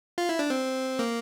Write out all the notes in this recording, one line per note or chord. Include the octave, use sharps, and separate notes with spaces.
F4
E4
D4
C4
A#3